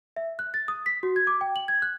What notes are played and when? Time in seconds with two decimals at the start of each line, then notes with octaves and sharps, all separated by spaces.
0.16 E5
0.39 F#6
0.54 A6
0.68 D#6
0.86 B6
1.03 F#4
1.16 G#6
1.27 D6
1.41 G5
1.56 F#7
1.68 G#6
1.82 F#6